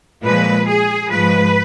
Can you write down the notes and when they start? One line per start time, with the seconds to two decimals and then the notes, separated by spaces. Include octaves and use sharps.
0.23 A#2 F3 G#3 B4
0.67 G#4
1.10 G#2 F3 G#3 B4